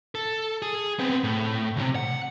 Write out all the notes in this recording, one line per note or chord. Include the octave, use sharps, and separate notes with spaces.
A4
G#4
B3 C4
A2
D2 C3
F#5